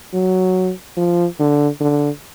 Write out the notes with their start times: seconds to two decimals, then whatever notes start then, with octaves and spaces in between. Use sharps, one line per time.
0.13 F#3
0.97 F3
1.39 D3
1.80 D3